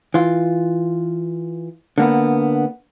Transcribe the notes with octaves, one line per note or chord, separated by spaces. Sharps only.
E3 F4
D3 A#3 B3